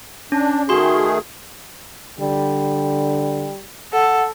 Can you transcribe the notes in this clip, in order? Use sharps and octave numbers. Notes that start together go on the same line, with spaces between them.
C#4 D4
D#3 A3 F#4 G#4 C6
D3 G3
A4 F#5